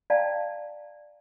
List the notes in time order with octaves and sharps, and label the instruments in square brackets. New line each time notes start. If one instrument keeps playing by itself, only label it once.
[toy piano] D5 F5 G5 A5 A#5